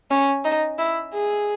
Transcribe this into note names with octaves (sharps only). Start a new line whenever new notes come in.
C#4
D#4
E4
G#4